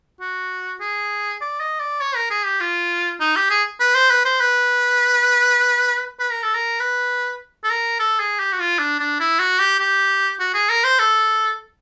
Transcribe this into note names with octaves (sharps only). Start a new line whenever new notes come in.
F#4
G#4
D5
D#5
D5
C#5
A#4
G#4
G4
F4
D#4
G4
G#4
B4
C5
B4
C5
B4
B4
A#4
A4
A#4
B4
A4
A#4
A4
G#4
G4
F#4
F4
D4
D4
E4
F#4
G4
G4
F#4
G#4
A#4
C5
A4